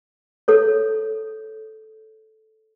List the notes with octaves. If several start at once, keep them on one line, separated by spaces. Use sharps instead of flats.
A4 C#5